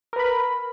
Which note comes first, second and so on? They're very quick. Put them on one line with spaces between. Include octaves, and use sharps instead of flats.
A#4 B4 B5